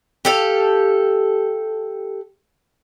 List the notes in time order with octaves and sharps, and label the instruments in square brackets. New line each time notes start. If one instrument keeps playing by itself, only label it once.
[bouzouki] G4 A4 F5